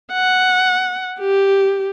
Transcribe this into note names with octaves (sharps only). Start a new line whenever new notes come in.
F#5
G4